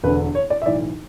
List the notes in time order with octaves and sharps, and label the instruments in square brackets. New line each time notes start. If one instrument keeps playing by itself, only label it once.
[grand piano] E1 D2 D3 B4
C#5
D5
E5
B1 A2 E3 D5